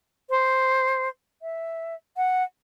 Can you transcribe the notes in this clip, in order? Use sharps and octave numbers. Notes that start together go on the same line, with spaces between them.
C5
E5
F#5